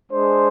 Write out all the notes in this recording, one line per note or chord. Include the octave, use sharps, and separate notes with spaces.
G#3 D4 G#4 C5